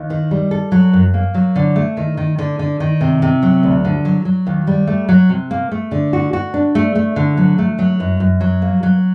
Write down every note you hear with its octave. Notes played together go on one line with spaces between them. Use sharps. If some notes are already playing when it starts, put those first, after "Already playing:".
Already playing: D#2
D#3
G3
A4
F#3
F#2
A#3
F#3
D3
A3
D#3
D#3
D3
D3
D#3
C3
C3
F#3
D2
D3
F#3
F#3
D#2
G3
A3
F#3
C3
A#3
A3
D3
F#4
F#4
D4
A3
A3
D3
F#3
A3
F#3
F#2
F#2
F#3
A#3
F#3